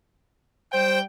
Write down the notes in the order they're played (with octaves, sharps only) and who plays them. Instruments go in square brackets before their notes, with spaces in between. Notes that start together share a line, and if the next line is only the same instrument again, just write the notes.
[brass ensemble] G3 G5 [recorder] C5